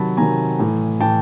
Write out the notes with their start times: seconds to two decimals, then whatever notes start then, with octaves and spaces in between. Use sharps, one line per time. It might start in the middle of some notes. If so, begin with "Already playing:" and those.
Already playing: C3 D#3 F#3 A5 B5
0.17 C3 D#3 F#3 G#5 A#5
0.59 A2 E3
1.00 A2 E3 G5 A5